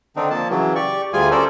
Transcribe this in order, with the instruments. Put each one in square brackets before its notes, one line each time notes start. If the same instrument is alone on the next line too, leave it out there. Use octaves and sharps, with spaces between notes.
[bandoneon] D3 D#3 C4 D4 D#4
F3 A#3 A5
C#3 E3 F#3
G4 D5 C#6
D2 G3 F4 G#4 G#5
C#4 A4 A#4 C5 D5